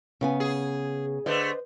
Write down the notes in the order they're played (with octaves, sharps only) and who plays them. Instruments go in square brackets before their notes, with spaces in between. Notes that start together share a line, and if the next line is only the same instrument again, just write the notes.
[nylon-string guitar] C#3 B3 G#5
[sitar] G#4
[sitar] D3 A3 [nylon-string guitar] B4 C5 D#5